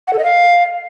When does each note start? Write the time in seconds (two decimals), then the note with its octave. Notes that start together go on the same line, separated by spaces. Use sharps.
0.08 F#5
0.13 A4
0.19 D#5
0.24 F5